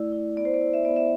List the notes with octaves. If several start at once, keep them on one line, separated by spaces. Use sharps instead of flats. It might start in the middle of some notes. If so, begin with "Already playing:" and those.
Already playing: A3 E4 D5
E4
B3 D5
C5
D5
E4
E5
B3 D5
E5